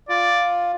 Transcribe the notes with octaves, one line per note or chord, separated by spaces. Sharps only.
F4 D5